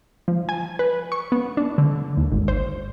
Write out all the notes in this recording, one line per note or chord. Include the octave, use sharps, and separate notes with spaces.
F3
G#5
B4
C#6
B3
D4
D3
D#2
G#1
C5